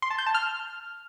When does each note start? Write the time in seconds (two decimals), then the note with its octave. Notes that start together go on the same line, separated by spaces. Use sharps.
0.02 C6
0.10 A5
0.18 G6
0.26 A5
0.34 F6